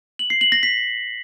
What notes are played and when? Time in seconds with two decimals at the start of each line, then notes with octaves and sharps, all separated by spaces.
0.19 F#7
0.30 C7
0.41 F#7
0.52 A#6
0.63 B6